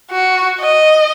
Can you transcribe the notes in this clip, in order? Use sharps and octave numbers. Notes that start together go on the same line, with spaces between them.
F#4
D#5